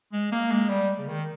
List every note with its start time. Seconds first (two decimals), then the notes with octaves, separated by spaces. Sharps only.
0.13 G#3
0.32 A#3
0.51 G#3
0.69 G3
0.98 C#3
1.08 D#3